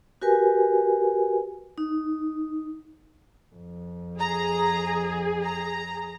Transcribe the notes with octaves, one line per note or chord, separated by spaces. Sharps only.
F#4 G4 A#4 B4 G#5
D#4
F2
G#4 A#5
A#5